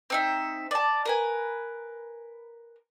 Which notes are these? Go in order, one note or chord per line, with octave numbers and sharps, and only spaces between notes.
C4 D#4 E5
D5 A5
A#4 B4 G#5